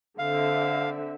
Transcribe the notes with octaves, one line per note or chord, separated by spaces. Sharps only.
D3 C4 E5 F5